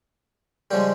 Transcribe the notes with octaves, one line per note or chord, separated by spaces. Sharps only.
C#3 F3 G3 G#3 G4